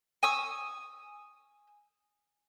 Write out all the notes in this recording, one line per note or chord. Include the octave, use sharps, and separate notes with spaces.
G#5 C#6 D#6 E6